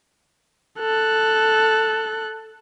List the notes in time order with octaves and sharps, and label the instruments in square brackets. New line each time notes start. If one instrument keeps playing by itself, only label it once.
[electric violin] A4 F#6